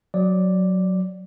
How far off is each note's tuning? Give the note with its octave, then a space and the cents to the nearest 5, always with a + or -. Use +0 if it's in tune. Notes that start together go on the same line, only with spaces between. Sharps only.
F#3 +0 D5 +0